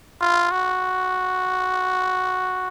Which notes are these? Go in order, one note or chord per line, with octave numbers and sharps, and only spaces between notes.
F4
F#4